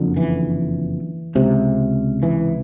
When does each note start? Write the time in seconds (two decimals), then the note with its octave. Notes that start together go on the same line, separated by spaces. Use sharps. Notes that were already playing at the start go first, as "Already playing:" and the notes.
Already playing: F#1 F2 D3
0.17 E3
1.35 C#2 C3
2.23 E3